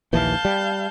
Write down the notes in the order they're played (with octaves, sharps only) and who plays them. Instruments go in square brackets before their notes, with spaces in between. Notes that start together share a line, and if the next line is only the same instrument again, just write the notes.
[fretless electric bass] A#1 D#2 E3 [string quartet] F5 A5 G6
[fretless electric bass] G3